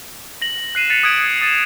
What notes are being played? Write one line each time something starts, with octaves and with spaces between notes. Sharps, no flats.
A#6 F#7
F#6 C7 D#7 E7
A6 B6 C#7 D#7 F7
D#6 F#6 G#6 C#7 D7
F#7
D#6 A6 D#7 E7